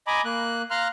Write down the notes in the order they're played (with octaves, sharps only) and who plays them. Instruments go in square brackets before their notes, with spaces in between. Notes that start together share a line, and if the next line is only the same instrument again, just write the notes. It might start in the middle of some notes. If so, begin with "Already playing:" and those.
[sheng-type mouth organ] D#5 G#5 A#5 B5 D6
A#3 F#6
F5 A#5 C6 F6 F#6